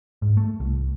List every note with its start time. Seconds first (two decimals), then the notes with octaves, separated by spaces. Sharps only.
0.22 G#2
0.37 A3
0.60 C2